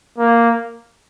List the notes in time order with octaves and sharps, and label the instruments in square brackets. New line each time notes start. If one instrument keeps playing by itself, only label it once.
[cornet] A#3